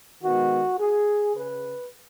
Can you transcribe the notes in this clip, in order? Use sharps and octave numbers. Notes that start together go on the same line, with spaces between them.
D#3 G#3 B3 F#4
G#4
C#3 B4